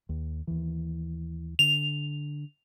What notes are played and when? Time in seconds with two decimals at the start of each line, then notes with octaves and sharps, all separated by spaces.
0.09 D#2
0.47 D#2 E3
1.59 D3 F7